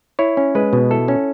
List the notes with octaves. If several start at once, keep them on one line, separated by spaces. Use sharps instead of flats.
E4 C#5
C#4
G#3 B4
B2
E4 A4
C#4